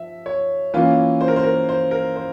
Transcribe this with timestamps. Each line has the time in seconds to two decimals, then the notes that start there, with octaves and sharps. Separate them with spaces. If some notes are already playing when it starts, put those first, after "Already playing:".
Already playing: F3 E5
0.26 C#5
0.74 E3 A#3 C#4 F4
1.21 C5
1.28 A#4
1.36 C5
1.44 A#4
1.69 C5
1.91 A#4
2.16 C5